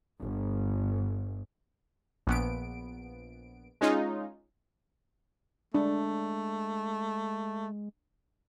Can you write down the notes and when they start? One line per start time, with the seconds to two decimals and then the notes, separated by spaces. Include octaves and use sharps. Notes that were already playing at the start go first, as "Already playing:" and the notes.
0.20 G1
2.27 A#1 B3 D7
3.81 G#3 C#4 D#4 F4
5.74 G#3 A3 D4